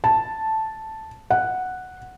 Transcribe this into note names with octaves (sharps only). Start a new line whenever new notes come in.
A5
F#5